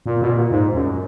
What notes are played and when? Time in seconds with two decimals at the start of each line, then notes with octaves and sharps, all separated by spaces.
0.06 A#2
0.22 B2
0.28 A#2
0.51 G#2
0.74 F#2